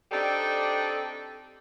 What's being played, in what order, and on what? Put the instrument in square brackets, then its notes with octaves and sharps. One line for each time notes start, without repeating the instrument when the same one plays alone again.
[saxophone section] C4 D4 D#4 G4 A4 D5